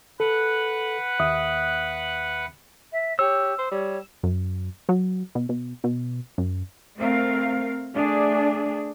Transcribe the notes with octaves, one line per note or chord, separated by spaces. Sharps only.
A4 B4 F#5
D#2 E5 D#6
E5
G4 C#5 E6
C5
G3 C#5
F#2
F#3
B2
B2
B2
F#2
A3 C4 A#4 F5
A3 D4 G#4